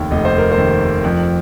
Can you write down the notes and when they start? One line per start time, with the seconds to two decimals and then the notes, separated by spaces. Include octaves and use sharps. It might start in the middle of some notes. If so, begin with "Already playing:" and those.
Already playing: F1 D#2 D#3
0.11 F1 D#5
0.25 C5
0.38 A#4
0.52 C5
0.58 D#2 D#3
1.04 F2